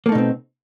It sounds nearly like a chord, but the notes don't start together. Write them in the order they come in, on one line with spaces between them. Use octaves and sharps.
A#3 A3 D#4 B2 C4